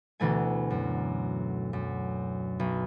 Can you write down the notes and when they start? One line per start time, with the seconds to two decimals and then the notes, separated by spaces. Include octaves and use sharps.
0.20 D2 B2 E3 A3 G#5
0.70 F#2
1.73 F#2
2.60 B1